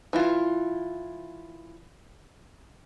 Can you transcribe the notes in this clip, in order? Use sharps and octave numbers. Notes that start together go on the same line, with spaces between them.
E3 E4 F4